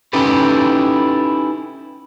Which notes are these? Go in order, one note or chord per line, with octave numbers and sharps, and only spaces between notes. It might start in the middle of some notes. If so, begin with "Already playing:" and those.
C#4 D#4 E4 G4 A4 B4